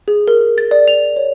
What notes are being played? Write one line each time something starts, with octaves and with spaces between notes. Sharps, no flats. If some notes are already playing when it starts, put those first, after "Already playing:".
G#4
A#4
A6
D5
F7
C#5